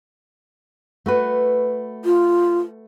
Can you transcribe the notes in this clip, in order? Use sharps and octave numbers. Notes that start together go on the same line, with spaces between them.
A3 F#4 B4
F4